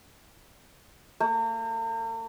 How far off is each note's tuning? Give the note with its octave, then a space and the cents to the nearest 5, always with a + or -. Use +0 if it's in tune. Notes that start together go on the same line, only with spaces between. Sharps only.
A#3 -45